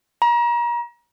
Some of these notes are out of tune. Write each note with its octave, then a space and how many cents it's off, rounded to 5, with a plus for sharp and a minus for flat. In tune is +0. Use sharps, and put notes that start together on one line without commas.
A#5 +35